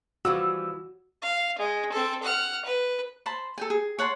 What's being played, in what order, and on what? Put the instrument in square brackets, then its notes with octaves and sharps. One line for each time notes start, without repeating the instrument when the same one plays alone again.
[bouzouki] E3 F3 G3 [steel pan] F#4 [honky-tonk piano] E6
[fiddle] F5
G#3
C4 A4
F#5 F6
B4
[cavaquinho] C5 A5 B5 C6
A4 G5 G#5
G#4
C#5 F#5 A5 C6